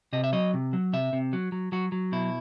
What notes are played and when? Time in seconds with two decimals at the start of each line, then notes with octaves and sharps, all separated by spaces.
0.13 C3 D#5
0.24 E5
0.33 F#3 D#5
0.54 C3
0.73 F#3
0.93 C3 E5
1.13 C3
1.33 F#3
1.52 F#3
1.72 F#3 F#4
1.92 F#3
2.12 B2 E4